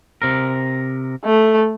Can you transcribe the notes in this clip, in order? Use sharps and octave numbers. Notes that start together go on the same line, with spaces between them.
C3 A#4
A3